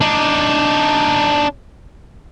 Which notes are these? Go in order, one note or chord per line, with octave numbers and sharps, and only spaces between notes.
D4 D#4